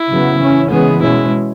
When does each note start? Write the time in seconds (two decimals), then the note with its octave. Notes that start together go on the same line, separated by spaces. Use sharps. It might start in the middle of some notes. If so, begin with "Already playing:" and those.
Already playing: E4
0.09 C#3 F#3 B3
0.39 E3 C#4
0.70 C#3 E3 G#3 B3 G#4
1.02 B2 G#3 C#4 E4